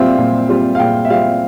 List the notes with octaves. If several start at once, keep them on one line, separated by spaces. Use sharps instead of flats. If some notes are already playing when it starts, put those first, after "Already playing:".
Already playing: A#2 G3 C4 F4 E5 F5
A#2
G3 C4 F4
F5
A#2 G5
E5
G3 C4 F4 F5